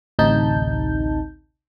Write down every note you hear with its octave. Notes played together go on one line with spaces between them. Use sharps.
A1 D2 C3 D#4 A5 G6